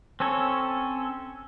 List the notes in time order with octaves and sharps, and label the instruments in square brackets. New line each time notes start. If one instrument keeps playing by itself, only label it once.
[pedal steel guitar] C4 C#4 A4 C#5